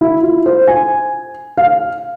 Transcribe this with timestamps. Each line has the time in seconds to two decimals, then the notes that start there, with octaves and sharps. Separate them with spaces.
0.01 E4
0.23 F4
0.46 C5
0.67 G#5
1.57 F5